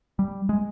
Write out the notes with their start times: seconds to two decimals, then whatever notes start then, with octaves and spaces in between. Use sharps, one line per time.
0.19 G3
0.49 G#3